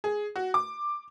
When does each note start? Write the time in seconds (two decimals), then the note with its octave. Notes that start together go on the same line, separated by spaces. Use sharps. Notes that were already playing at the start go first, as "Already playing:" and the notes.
0.04 G#4
0.36 F#4
0.54 D6